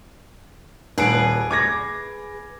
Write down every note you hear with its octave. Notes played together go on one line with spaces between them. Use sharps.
D#1 G#4 B4 D7
D6 G#6 A#6